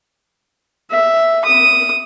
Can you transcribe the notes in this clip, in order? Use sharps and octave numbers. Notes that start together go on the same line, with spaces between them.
E5
D#6